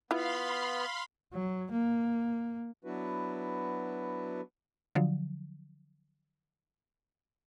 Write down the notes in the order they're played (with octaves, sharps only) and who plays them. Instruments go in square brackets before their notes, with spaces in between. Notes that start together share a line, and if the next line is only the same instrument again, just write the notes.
[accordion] B3 [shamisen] E4 F4 [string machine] F5 B5 C6
[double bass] F#3
A#3
[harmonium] F#3 B3 D4 E4 F#4 B4
[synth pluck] D3 F3 F#3